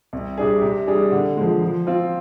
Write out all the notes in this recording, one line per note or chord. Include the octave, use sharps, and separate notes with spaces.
C2
C3 G3 D4 G#4
C3
G3 D4 G#4
D3
F3 G#3
F3
C4 F4